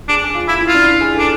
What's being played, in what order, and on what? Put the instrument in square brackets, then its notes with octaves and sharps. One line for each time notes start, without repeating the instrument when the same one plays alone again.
[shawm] D4 [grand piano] G#4
[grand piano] G#4
F4
[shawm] E4 [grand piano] F4
[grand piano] E4
[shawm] F4
[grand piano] D4
E4
G#4
[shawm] D4 [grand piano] A4